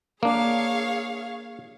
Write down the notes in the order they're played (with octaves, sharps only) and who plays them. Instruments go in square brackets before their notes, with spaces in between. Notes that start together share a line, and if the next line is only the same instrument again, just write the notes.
[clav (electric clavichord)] A#3 D4 [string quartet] G#4 C#5 F5